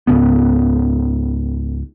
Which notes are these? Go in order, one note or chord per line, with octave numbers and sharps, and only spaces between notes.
C#2 G#2 C#3 B3